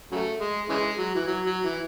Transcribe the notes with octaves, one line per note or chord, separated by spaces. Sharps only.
C#3 F#3 A3
G#3
C#3 E3 G#3
F#3
E3
F#3
F#3
E3